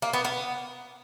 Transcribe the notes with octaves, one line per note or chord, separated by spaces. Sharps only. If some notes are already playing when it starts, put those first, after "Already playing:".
A#3
B3
B3